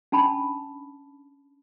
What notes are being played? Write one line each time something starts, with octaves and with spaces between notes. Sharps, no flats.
C#4 D4 A5 B5